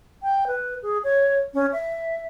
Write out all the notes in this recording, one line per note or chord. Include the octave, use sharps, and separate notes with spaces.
G5
B4
G#4
C#5
C#4
E5